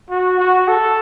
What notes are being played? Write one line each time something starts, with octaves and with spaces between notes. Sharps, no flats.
F#4
F#4
A4